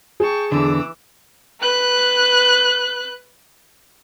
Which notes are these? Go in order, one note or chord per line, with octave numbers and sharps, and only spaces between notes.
G#4 G5 A5 C#6
E2 D3 E3 D6 E6
B4 F#6